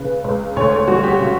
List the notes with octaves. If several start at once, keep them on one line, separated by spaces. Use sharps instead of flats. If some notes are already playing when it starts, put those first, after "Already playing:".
Already playing: C#2 C#3 B4
C#2
D2 C#5
C#5
G3 F#4
G4
C#3